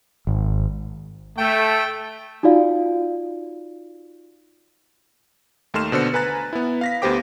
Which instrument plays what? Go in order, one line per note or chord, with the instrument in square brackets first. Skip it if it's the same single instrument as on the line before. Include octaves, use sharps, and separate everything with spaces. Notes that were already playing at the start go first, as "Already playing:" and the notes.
[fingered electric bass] G#1
[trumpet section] A3 [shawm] G5
[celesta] D#4 F4 F#4 D5 F5
[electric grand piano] D#2 A3 D#4 C6 F6 E7
B2 D3 C5 C#7
B4 G#5 A#5 F#6 A6
B3 E4
F5 A#6 B6
D2 B3 G4 C5 G5 D6